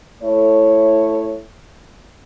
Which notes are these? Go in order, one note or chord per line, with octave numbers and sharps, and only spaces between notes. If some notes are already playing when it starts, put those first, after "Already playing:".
A3 E4 A4 C#5